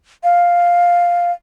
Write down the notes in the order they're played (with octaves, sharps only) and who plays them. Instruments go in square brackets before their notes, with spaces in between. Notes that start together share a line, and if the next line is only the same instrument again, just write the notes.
[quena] F5